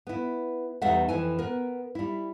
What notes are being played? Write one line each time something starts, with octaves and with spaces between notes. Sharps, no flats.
B3 E4
E2 G3 A3 D#4 E5 F#5
F2 E3 E4 G#5
B3 A#4
G3 E4